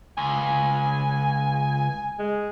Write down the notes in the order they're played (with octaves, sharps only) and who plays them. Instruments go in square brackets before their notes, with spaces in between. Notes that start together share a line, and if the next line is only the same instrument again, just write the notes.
[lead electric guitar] C#2 [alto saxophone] G#5
[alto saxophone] G#3